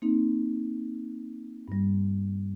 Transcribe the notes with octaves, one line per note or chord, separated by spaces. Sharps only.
A#3 C4 D#4
G2 G3